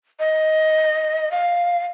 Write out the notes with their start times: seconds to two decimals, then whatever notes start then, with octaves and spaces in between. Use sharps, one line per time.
0.20 D#5
1.32 F5